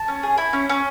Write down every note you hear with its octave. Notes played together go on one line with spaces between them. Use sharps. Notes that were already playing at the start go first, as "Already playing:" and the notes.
Already playing: A5
C#4
G#4
E4
C#4
C#4